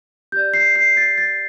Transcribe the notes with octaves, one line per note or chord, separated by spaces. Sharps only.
G4 D5 G6
C7
C7
A6
A6